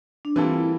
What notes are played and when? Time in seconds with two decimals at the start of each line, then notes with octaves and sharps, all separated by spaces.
0.25 D4
0.36 E3 G3 A#3 C4 F4 A4
0.54 E4